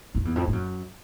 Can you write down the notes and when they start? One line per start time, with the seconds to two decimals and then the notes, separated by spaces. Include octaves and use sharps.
0.15 F2
0.25 E2
0.36 F2
0.47 G2
0.53 F#2